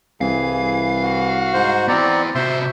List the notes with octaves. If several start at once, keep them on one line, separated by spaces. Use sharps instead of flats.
C2 E3 G#4 F5
F#4
G#2 C5
B3 C4 E4 D5 A#5
C3 F#4 C5 E5 C6